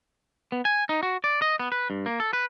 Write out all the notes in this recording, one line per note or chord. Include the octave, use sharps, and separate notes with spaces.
B3
G#5
D#4
F#4
D5
D#5
B3
B4
G2
A#3
A4
B4